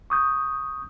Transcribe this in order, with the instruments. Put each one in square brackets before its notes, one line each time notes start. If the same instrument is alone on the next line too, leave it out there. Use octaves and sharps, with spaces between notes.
[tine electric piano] C#6 D#6 G6